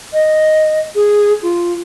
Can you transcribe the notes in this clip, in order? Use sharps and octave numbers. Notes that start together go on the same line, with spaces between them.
D#5
G#4
F4